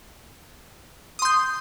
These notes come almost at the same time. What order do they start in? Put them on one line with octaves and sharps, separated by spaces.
D#6 C6 G6